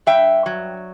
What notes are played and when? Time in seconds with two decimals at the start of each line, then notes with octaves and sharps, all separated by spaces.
0.06 G2 E5 G5
0.46 F#3